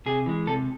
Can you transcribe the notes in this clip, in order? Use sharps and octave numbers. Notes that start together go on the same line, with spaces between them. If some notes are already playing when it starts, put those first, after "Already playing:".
C3 G#4
E3 G#3
C3 A4